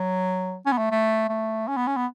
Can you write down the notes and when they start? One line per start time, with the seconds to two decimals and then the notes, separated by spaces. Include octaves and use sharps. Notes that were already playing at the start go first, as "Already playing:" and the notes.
Already playing: F#3
0.66 C#4
0.72 B3
0.78 A3
0.91 A3
1.29 A3
1.68 C#4
1.77 B3
1.87 C#4
1.97 B3